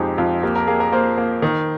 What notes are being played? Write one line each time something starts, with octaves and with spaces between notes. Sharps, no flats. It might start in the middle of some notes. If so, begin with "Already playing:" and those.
Already playing: F2 F3 G#3 D#4 G4 G#4
F2 F4
A#3 G4
A#4
A#3 G#4
A#4
A#3 C5
A#3
D#3